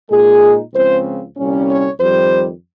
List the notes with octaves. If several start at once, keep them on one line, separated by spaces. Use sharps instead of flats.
A#2 G#3 D#4 G#4
C#2 C#3 F3 C4 C5
C2 A#2 G3 C#4
C#5
F2 D#3 G3 C5